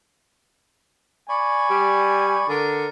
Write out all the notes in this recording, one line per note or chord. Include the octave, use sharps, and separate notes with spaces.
D5 G#5 B5 C#6
G3
D3 A#4